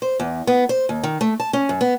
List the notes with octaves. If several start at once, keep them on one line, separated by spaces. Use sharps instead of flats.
C5
E2
B3
C5
D#2
D#3
A3
A5
C#4
F#2
B3